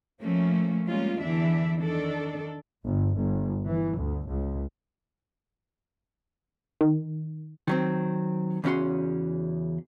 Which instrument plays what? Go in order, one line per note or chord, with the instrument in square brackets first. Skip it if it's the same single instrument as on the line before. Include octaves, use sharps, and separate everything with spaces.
[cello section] F3 A3 A#3 C#4
G3 G#3 A#3 C#4 F4
E2 D3 E3 D4 E5
D#3 D4 A4
[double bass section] G1
G1
E3
D2
C#2
[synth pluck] D#3
[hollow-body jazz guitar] D#3 F#3 C4
E2 C#3 C#4 F#4 C6